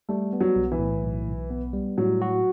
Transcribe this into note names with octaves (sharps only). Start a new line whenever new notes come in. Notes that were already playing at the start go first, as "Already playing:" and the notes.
G3 A3
B3
F#3
B1
E3
A2
B1
B1
B3
G3
A2 F#3
F#4